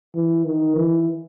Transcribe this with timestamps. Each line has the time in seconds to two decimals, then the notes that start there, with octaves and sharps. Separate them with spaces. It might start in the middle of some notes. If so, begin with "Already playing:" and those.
0.15 E3
0.46 D#3
0.76 E3